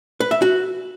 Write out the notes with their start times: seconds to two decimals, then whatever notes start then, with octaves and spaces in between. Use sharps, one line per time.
0.20 B4
0.31 E5
0.42 F#4